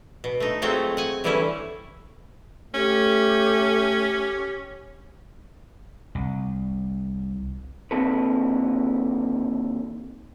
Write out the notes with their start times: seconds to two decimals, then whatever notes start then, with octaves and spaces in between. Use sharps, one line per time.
0.24 B2
0.40 A3 D#4
0.62 F#3 G#3 A3 C4 F4 F#4
0.97 F#5 G#5
1.24 D3 E3 G3 A3 C#4 E4
2.74 A3 C#4 G4
6.15 C2
7.91 D#2 D3 F#3 C4 A4 B4